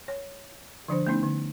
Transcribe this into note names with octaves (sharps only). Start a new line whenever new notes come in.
C#5
D3 F3 D4 C5
A3 B3 C#4 D#4
D3